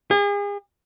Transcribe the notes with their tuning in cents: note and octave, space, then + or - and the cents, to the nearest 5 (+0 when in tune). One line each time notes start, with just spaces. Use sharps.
G#4 -40